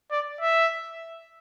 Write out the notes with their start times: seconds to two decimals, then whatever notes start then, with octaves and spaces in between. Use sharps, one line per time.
0.11 D5
0.41 E5